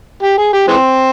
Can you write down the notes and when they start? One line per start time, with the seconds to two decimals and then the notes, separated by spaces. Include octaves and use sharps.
0.23 G4
0.38 G#4
0.53 G4
0.67 E3 G#3 C4